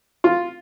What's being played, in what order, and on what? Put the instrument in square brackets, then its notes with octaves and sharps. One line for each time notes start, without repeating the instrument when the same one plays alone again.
[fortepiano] F4